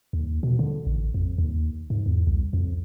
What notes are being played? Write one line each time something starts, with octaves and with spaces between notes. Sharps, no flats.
D#2
B2
D3
A1
F2
D#2
G#2
E2
C2
F2